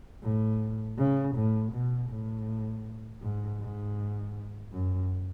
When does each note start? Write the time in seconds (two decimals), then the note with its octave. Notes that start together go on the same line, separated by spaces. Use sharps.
0.23 A2
0.98 C#3
1.36 A2
1.73 B2
2.10 A2
3.22 G#2
3.60 G#2
4.72 F#2